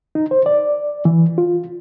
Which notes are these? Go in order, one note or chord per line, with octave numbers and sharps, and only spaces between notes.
D#4
C5
D5
E3
F4